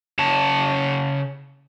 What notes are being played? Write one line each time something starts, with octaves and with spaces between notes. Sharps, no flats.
C#3 C#5 A5